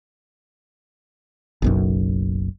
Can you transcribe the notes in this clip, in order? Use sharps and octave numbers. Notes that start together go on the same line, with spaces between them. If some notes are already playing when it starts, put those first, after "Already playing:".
F#1 B1 F#2